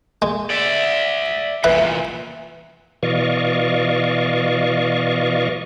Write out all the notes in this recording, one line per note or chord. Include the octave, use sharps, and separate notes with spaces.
G#3
D5 E5
E2 A#2 B4 E5 B5
B2 E3 D5 D#5 F5 C#6